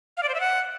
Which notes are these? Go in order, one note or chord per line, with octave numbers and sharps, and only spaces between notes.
F5
D5
C5
E5
F#5